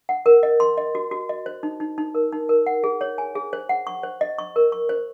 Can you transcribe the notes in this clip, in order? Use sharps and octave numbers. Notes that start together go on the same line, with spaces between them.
F#5
A#4
D#5
C6
D#5
F#4
F#4
D#5
C5
D#4
D#4
D#4
A#4
D#4
A#4
F#5
G#4
C#5
G#5
G#4
C5
F#5
C#6
C5
D#5
C#6
A#4
C#6
C5